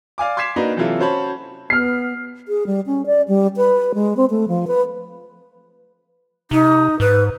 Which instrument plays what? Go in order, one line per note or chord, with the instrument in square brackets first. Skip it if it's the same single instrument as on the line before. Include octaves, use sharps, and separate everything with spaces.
[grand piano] D5 F5 G#5 D6
C6 D6 G#6 B6 C7 E7
A#3 D4 D#4 F#4 B4
C3 E3 F#3 E4 F4 A4
C#4 F#4 C5 C#5 A5 B5
[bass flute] B3 [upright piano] F6 C7
[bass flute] G#4
G3
C#4
D5
G3
B4
G#3
C4
A3
F3
B4
[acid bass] C3 [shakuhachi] D#4
[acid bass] G#2 [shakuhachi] B4